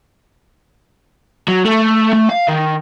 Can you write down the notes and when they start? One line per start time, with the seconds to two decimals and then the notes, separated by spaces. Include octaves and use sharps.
1.48 F#3
1.65 A3
2.13 A3
2.29 F5
2.48 D#3